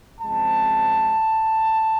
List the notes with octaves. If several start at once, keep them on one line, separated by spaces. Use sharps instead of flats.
F#2 C#3 F3 G#3 C4 A5